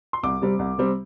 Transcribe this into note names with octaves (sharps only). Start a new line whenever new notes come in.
C6
C2 D6
C3 G3 C4
C2
C3 G3 C4